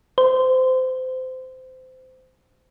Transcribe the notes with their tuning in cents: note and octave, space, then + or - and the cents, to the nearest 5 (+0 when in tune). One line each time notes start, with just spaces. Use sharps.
C5 -25